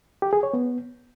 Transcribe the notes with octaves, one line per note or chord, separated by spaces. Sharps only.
G4
G#4
C#5
B3